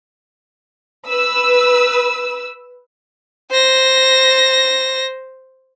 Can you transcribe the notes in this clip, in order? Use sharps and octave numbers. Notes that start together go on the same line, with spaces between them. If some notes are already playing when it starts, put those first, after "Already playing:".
B4 E6
C5 A#6